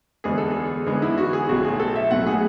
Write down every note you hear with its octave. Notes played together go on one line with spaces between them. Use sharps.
E2 D3 G#3 B3 G#4
A4
G#4
E2 D3 G#3 B3 G#4
E4
F#4
G#4
B1 A2 F#3 A3 F#4
G#4
A4
E5
B1 A2 F#3 A3 F#5
G#4